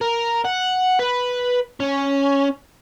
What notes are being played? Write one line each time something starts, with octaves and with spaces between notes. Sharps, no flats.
A#4
F#5
B4
C#4